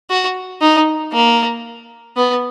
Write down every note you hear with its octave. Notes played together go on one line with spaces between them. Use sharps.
F#4
D#4
A#3
B3